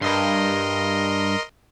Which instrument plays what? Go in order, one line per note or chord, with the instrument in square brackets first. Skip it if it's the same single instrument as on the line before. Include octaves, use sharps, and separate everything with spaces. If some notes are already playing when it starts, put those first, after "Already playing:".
[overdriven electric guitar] G2 [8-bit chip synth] A#4 D#5 C6